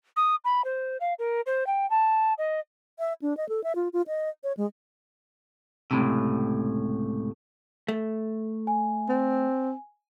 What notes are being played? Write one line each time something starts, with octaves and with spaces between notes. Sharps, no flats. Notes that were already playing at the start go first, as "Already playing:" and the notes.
D#6
B5
C5
F5
A#4
C5
G5
A5
D#5
E5
D4
D#5
A4
E5
F4
F4
D#5
C#5
G#3
C#2 A2 C3
A3
G#5
C4